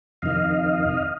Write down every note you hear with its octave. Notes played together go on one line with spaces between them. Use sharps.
F2 C3 D#3 D#5 F5